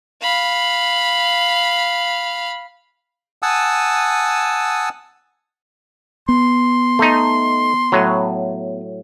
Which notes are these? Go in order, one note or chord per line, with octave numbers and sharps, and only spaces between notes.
F5 B5
F#5 G#5 A5 D#6 E6
B3 C6
A3 D#4
A2 F#3